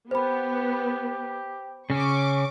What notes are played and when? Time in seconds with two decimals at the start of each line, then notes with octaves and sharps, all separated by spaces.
0.11 B3 G4 C5 B5
1.90 C#3 C#4 C#6 D6